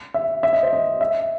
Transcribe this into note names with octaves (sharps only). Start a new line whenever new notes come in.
E5
E5
D#5
C5
D#5
E5